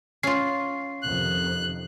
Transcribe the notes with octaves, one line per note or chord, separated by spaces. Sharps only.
C#4 F4 C7
F2 C3 D#3 F#6